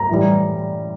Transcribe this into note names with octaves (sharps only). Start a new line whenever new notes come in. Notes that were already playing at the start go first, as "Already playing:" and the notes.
Already playing: A#5
A2 E3 G3